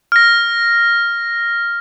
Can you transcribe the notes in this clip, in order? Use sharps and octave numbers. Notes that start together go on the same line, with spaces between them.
F6 A#6